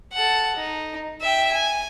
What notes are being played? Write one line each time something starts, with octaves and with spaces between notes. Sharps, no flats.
A4 F#5
D#4
E5 G5
G#5